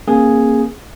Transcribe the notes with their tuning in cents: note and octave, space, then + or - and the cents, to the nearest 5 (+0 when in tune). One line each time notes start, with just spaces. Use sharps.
A#3 +0 C#4 -45 G#4 +0